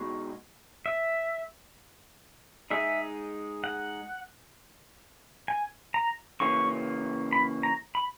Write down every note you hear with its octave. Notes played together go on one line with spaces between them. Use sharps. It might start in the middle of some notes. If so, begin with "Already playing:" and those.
Already playing: B2 G#3 D#4 F#4
E5
G#3 D#4 G#4 E5
F#5
G#5
A#5
C#3 E3 A#3 C#4 C#6
B5
A#5
B5